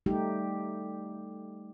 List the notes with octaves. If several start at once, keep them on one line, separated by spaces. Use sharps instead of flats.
G3 A3 D#4 G4